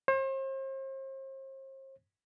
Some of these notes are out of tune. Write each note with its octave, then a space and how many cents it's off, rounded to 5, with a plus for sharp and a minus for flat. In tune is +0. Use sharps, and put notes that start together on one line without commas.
C5 +40